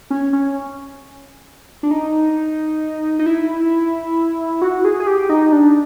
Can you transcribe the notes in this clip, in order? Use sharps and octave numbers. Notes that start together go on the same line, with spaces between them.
C#4
C#4
D4
D#4
D#4
E4
F#4
G#4
G#4
G4
D#4
D4